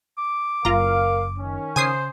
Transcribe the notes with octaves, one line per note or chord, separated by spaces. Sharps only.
D6
F#1 F4 A#4 F5 A#5
D#3 C#4
C#3 C5 G#5 D#6 C7